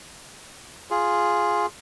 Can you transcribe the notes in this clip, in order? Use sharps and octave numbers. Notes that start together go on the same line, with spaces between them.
F4 G#4